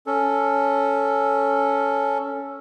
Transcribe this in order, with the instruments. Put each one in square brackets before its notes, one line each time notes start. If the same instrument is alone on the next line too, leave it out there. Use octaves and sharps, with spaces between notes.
[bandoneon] C#4 A4